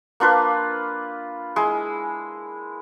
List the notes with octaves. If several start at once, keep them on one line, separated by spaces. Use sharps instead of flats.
A#3 D4 F4 B4
G#3 E4